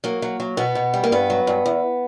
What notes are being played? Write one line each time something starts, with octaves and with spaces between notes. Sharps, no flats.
F#3 A#3
F#3
F#3
B2 B3
B2
G3
A#3
G2 B3
F#3
G2
E2